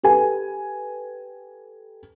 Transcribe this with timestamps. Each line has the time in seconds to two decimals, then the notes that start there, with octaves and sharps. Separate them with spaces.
0.03 G4 A4 B4 G#5